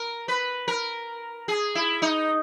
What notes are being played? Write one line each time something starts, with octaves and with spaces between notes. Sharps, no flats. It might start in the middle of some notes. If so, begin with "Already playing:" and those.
Already playing: A#4
B4
A#4
G#4
E4
D#4